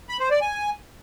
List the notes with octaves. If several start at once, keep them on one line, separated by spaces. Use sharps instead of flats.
B5
C5
D5
G#5